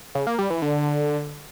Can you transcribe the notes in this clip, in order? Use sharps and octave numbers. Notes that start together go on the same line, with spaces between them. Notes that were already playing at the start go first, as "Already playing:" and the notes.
C#3
A#3
G3
E3
D3